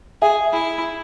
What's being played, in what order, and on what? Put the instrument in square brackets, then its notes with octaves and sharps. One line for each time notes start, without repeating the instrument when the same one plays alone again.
[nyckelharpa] G#4 [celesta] E5 G#5
[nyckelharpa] E4